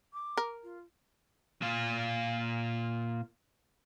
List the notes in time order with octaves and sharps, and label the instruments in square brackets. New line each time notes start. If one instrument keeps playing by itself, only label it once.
[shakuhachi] D6
[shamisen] A#4
[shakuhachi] F4
[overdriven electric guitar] A#2 F4